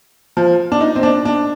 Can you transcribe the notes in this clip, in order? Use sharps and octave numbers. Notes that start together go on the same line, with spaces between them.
F3
D4
D#4
C4
D4
D4